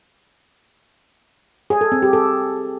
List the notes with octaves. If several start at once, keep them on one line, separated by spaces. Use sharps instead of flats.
G#4
A4
C4
G4
A4